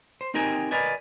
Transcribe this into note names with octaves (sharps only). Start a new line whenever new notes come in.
C5
C4 D#4 G4 A#4 G5 G#5
A#4 B4 D5 D#5 G#5